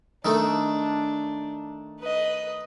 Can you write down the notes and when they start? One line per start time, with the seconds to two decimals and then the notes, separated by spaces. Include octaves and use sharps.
0.25 D#3 A3 D4 D#4
1.99 B4 D#5